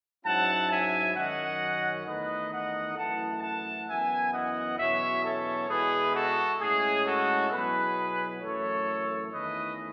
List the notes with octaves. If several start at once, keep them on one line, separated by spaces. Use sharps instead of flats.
G#2 F#3 C#4 E4 F#5 A5
E5 G#5
F#2 D#3 F#3 C#4 D#5 F#5
E2 D#3 A3 D#4 B4 D#5
D#5 F#5
F#2 E3 A3 E4 F#5 A5
F#5 A5
F#2 E3 B3 E4 E5 G#5
D#5 F#5
E2 B2 F#3 C#4 C#5 E5
A4 C#5
E2 B2 G#3 B3 E4 G#4 B4
F#4 A4
A2 G#3 C#4 E4 G#4
F#4 A4
B2 F#3 B3 E4 G#4 B4
F#2 E3 A3 A4 C#5
E2 D#3 A3 C#4 E4 B4 D#5